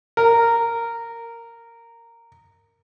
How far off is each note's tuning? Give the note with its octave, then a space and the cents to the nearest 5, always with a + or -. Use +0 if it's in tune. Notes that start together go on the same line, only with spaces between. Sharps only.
A#4 -10